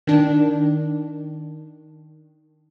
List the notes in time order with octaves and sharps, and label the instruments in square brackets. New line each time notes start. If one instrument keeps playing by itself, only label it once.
[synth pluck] D#3 D4